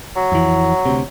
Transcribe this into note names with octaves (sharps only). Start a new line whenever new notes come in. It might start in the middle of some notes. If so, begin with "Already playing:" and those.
F#3
F2 E3
D2 C3